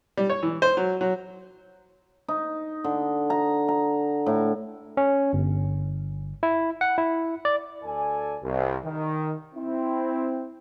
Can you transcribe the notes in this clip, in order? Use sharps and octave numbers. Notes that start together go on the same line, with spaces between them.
G3
C#5
E3
C5
F#3
F#3
D#4
D3
A#5
A#5
A2
C#4
G1
E4
F#5
E4
D5
D2 A4 D5 G#5
C2
D#3
C4 E4